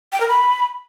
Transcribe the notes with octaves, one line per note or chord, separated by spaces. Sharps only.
G5
A#4
B5